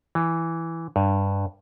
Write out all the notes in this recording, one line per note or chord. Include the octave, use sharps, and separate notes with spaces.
E3
G2